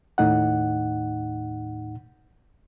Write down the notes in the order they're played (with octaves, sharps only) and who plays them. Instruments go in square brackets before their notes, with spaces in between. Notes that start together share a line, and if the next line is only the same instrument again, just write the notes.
[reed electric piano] D#2 A2 D#4 F#5